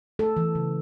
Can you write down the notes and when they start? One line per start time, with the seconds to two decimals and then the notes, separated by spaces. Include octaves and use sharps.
0.19 A3 A4
0.37 E3
0.55 C#3